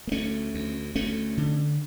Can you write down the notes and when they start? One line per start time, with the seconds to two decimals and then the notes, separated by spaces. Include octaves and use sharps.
0.07 A#3
0.12 D2 A3 C#4
0.54 D2
0.95 D2 A3 C#4
1.37 D3